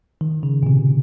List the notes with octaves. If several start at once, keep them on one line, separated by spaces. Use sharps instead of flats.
D#3
C#3
A#2
C3